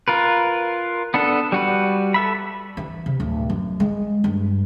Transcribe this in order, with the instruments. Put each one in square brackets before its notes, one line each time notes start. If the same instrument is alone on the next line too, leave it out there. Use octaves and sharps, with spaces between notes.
[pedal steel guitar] F4 A#4 B4
B3 D4 A4
G3 F#4 B4
A4 E5 B5
[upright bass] E3
C3
D1
F#2
G#3
G2